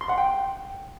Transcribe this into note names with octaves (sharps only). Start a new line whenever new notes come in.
C6
F#5
G5